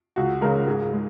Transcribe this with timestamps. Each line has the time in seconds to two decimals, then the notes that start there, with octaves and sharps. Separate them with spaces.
0.16 C#2 F#4
0.41 C#3 G#3 A#4
0.67 G#2 G#4
0.93 G#3